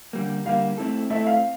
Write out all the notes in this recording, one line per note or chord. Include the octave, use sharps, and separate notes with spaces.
D3 G3 A#3
D3 G3 A#3 F5
A3 C4 E4 A4
A3 C4 E4 A4 E5
F5